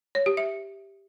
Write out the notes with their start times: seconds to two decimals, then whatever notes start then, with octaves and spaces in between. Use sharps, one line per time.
0.15 C#5
0.26 G4
0.37 E5